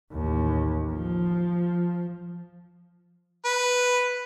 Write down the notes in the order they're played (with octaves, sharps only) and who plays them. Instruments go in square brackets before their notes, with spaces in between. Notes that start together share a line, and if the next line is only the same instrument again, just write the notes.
[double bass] A1 D#2
F3
[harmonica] B4